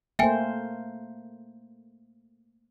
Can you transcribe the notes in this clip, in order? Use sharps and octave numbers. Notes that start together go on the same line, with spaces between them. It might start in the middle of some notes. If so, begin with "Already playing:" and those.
A3 A#3 C5 E5 G5 G#5